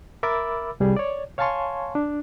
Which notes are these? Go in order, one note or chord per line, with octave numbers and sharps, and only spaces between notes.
A#4 E5 B5 D6 E6 A6
C2 G3 G#4
C#5 D5
C#5 F5 G#5 A5 C6 C#6
D4